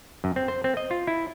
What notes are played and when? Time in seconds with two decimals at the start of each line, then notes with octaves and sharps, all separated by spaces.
0.24 F#2
0.36 C4
0.48 C5
0.64 C4
0.77 D#5
0.91 F4
1.07 E4